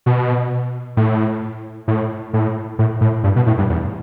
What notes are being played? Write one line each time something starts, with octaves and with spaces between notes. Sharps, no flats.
B2
A2
A2
A2
A2
A2
G2
B2
A2
G2
E2